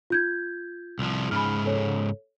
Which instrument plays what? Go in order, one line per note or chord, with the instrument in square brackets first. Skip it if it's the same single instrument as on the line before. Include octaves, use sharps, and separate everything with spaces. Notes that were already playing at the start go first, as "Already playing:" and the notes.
[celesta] F4 G6 G#6
[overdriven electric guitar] C2 F3
[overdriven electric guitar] G#2 C#3 [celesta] B5 F6
[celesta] A4 C#5